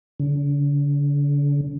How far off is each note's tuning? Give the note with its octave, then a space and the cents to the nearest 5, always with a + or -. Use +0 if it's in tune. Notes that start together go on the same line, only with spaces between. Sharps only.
D3 -40